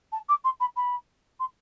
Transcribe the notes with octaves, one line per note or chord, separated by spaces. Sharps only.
A5
D6
C6
B5
B5
C6